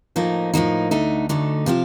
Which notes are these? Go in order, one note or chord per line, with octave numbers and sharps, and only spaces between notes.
A2 F3 A#3 D#4
A2 F3 A#3 D#4
D2 D3 A3 D#4
D2 D3 A3 D#4
C3 F3 C4 F4